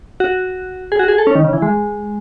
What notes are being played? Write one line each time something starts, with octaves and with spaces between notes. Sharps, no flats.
F#4
G#4
F#4
G#4
A4
C#4
D#3
C#3
E3
G#3